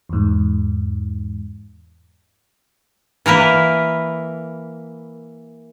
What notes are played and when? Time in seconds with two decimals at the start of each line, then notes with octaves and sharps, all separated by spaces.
0.09 E2 G#2
3.26 E3 A#3 A#4 B4